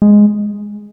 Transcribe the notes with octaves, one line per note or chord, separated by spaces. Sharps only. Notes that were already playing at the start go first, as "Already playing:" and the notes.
G#3